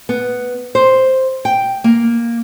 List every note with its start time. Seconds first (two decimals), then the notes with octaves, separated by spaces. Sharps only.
0.09 B3
0.75 C5
1.45 G5
1.84 A#3